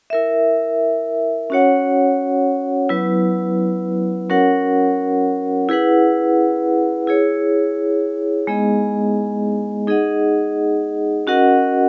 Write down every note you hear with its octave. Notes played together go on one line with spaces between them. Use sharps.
E4 A#4 E5
C#4 F#4 C#5 F#5
F#3 B3 E4 B4
C#4 F#4 A#4 C#5 F#5
E4 G#4 B4 F#5
E4 G#4 C#5
G#3 B3 D#4 G#4 D#5
D#4 G#4 D#5 F#5
C#4 F#4 A#4 D#5 F#5